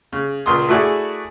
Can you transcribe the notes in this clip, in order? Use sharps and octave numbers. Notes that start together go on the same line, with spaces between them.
C#3
C#2 A#2 C6 D#6
A3 E4 F#4 G#4 D5